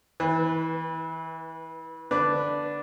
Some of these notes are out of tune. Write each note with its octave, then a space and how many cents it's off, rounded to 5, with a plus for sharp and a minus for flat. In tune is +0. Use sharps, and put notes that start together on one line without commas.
E3 -25 B4 +0
D3 +0 D4 -5 B4 +0